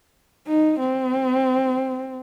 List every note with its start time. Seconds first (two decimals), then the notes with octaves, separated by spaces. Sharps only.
0.47 D#4
0.79 C4